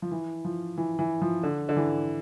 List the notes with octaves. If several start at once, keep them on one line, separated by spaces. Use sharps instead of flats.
F3
E3
F3
E3
E3
F3
D3
D3
E3